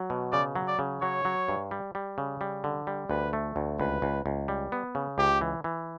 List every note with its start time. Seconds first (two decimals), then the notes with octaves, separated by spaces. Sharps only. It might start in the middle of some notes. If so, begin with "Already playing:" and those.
Already playing: F#3
0.10 B2
0.32 C#3 D5
0.56 F#3
0.68 D5
0.79 C#3
1.01 F#3 C#5
1.25 F#3
1.49 G2
1.71 G3
1.95 G3
2.18 C#3
2.41 G3
2.64 D3
2.87 G3
3.09 D2 B4
3.33 A3
3.56 D2
3.80 C#2 B4
4.02 C#2
4.26 C#2
4.48 G3
4.72 B3
4.95 C#3
5.18 C#2 G4
5.41 E3
5.64 E3